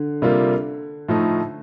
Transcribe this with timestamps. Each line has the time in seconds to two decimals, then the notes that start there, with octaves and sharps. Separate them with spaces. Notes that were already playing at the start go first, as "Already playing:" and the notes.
Already playing: D3
0.22 C3 G3 A#3 F4
1.09 A2 F3 A3 D#4